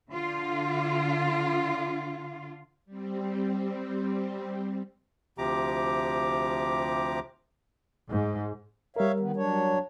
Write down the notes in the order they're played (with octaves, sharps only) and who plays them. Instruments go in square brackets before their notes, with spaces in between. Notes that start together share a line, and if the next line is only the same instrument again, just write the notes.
[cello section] D3 F4
[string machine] G3 C4
[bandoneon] D2 C3 F3 G4 A#5 D6
[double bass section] G#2
[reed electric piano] G3 A#4 [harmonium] C#5 E5 F5
[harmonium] D#3 B3
F#3 D4 C#5